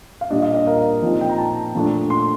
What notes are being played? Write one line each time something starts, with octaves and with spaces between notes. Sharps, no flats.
F5
A#2 G3 D4 D#5
F5
D#5
A#4
A#2 F3 C4 D#4
G5
A#5
A5
A#2 F3 A3 D4
C6